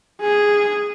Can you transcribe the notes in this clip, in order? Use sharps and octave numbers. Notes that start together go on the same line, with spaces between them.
G#4